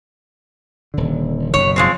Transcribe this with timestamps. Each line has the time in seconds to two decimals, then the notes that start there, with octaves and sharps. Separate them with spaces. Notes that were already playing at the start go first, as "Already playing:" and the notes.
0.94 D#1 D3
1.54 F#1 B2 C#5
1.76 F3 G#3 C4